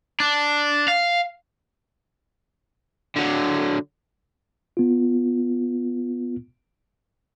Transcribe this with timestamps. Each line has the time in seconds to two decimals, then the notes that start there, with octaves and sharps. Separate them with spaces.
0.20 D4
0.88 F5
3.16 D3 F#3
4.77 B3 F4